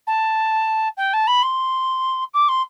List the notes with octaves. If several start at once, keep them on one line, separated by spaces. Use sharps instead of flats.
A5
G5
A5
B5
C6
D6
C6